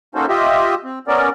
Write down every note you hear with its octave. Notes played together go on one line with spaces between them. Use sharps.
A#3 C#4 D#4 F#4 A4 C5
F4 G4 D#5 E5
C4
B3 C#4 A#4 D5